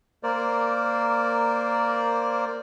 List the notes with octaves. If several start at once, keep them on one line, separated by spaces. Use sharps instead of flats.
A#3 A#4 C5 D5